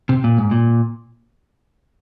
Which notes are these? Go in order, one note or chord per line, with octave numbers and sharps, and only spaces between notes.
C3
A#2
G#2
A#2